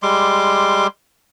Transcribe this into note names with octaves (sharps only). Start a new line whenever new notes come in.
G3 G#3 C6 D6